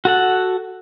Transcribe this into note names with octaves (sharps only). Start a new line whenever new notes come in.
F#4 A4 F#5